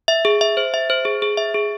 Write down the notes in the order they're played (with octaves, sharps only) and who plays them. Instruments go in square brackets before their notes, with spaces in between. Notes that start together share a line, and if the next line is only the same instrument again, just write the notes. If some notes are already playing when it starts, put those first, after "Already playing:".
[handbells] E5
G#4
E5
C5
E5
C5
G#4
G#4
E5
G#4